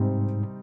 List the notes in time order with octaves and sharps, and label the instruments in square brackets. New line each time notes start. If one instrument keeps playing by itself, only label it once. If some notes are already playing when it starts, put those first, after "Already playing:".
Already playing: [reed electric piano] G#2 [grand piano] C3 G3 C4 D#4